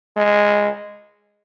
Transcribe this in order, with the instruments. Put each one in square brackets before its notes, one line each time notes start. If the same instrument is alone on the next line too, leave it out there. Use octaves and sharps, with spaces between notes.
[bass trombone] G#3